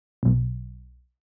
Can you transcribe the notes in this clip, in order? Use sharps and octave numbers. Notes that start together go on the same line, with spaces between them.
B1